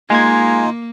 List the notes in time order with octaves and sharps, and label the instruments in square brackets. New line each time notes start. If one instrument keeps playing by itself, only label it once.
[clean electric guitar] G#3 [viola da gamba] A#3 [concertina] D#4 F4 [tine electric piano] G#5 G#6